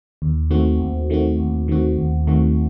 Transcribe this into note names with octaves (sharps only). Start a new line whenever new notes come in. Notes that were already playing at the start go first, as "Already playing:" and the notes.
D#2
D#3 A3 C4 F#4
D#2
D#3 A3 C4 F#4
D#2
D#3 A3 C4 F#4
D#2
D#3 A3 C4 F#4